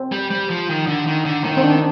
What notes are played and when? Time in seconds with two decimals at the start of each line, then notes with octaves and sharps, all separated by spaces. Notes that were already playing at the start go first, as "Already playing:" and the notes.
Already playing: C4
0.12 G3
0.31 G3
0.50 F3
0.69 D#3
0.87 D3
1.07 D#3
1.25 D3
1.44 D#3 A#3
1.57 C4
1.63 D4